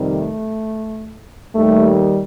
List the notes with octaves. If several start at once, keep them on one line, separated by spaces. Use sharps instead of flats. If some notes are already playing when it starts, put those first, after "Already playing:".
Already playing: F2 C3 D#3 G3
A3
D#2 D#3 G3 A3